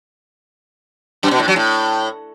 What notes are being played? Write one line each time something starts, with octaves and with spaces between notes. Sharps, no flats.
F#2
B2
A2
F#3
A2